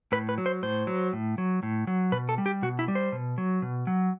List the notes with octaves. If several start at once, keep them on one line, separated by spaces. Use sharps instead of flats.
A2 B4
B4
F#3
C5
A2 C5
F#3
A2
F#3
A2
F#3
B2 B4
A4
G3
G4
B2 F#4
E4
G3
C5
B2
F#3
B2
F#3